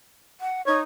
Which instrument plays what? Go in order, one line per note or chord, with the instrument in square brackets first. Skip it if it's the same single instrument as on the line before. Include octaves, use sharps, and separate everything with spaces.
[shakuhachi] F#5
[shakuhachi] D#4 [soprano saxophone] C#5